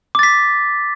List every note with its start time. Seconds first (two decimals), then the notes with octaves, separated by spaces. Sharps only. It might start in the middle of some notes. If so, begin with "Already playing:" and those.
0.15 D6
0.19 A6
0.23 B6